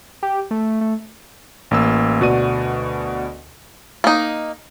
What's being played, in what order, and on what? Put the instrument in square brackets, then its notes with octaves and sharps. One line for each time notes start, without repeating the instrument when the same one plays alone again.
[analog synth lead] G4
A3
A3
[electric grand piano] A1 A#3 E6
D2 B2 F#4 D5 D#7
[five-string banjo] A#3 D#4